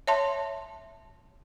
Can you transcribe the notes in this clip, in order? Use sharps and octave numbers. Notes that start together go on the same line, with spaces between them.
C#5 E5 A5 C6